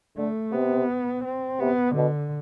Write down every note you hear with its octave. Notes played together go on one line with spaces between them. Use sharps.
D3 A3
C3 B3
C4
C3 B3
B2 D3